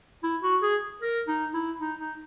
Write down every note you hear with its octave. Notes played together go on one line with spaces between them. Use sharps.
E4
F#4
G#4
A#4
D#4
E4
D#4
D#4